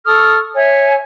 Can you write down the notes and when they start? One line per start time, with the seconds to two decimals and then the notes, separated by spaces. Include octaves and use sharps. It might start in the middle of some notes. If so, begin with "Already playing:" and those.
0.05 A4 C#6 D#6 F6
0.55 C#5 E5 G#5